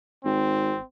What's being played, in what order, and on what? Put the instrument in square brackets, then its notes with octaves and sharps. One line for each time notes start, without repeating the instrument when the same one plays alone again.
[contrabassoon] G#1 [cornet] C4